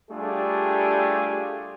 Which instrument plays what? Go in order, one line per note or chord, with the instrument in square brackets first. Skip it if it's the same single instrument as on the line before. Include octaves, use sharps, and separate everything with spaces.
[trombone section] G3 A3 D4 F4 G4 G#4